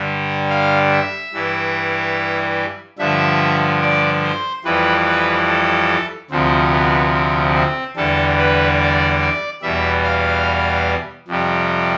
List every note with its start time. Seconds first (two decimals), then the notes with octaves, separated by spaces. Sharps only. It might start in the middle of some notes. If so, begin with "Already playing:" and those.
Already playing: G2 D3 G3
0.50 F5
0.92 E5
1.33 G2 E3 G3
2.99 G2 D3 F3 E5
3.81 D5
4.23 C5
4.64 F2 E3 G3 B4
5.06 B4
5.48 A4
6.30 D2 C3 F3 C4
6.72 B3
7.13 C4
7.55 C4
7.96 E2 D3 G3 A4
8.38 B4
8.79 D5
9.21 D5
9.62 E2 B2 G3 E5
10.04 F5
11.28 F2 C3 G3